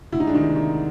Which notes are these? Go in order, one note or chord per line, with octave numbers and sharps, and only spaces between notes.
D2 E4
D#4
G#3 D4
D#3 D#4
C3
D#3